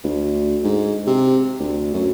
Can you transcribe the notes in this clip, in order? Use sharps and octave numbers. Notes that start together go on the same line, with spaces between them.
D2
G#2
C3
D2
F#2